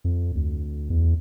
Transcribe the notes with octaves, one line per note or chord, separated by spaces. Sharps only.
F2
D2
E2